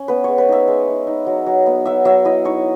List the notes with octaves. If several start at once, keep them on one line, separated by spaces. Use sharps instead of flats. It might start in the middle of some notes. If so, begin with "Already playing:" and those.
Already playing: C#4
B3 B4
G#3 C#5
B4
D#4 E5
G#3
D#4
D#4
F#3
F#3
B3
F#3 E5
F#3 E5
E4 D#5
D#4 C#5